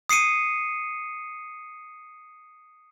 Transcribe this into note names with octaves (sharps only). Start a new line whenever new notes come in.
D#6 C7 C#7 D#7